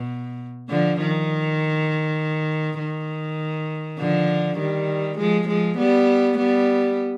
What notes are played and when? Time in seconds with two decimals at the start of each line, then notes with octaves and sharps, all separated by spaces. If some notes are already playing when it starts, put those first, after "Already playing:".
Already playing: B2
0.69 D3 F3
1.00 D#3
2.79 D#3
3.98 D3 F3
4.58 D#3 G3
5.18 F3 G#3
5.48 F3 G#3
5.78 G3 B3
6.38 G3 B3